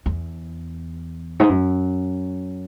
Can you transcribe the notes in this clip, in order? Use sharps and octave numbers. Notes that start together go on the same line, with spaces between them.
E2
G#2
F#2